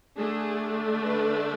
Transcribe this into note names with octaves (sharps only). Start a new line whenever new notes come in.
D3 A3 D4 G#4
B4